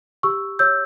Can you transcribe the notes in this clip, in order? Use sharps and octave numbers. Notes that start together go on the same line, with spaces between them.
G4 C#6 E6
C#5 E6 G6